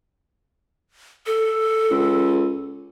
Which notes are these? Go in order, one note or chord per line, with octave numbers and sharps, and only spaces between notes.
A4
C#2